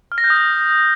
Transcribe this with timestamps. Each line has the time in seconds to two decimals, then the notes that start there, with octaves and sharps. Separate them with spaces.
0.12 F6
0.18 A#6
0.24 G6
0.30 D#6
0.36 A#6